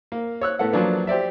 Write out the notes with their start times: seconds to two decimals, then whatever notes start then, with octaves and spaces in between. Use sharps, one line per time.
0.12 A#3
0.41 C#5 E6 F#6
0.59 A2 B3 A4 F#5
0.73 F3 F#3 A#3 D4 B4
1.07 G4 C5 D5 E5